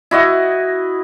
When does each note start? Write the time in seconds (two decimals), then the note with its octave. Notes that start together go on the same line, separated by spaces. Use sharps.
0.11 E4 F#4 D#5